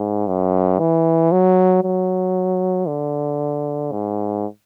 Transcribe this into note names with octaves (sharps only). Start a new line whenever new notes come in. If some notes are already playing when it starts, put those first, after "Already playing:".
Already playing: G#2
F#2
E3
F#3
F#3
D3
G#2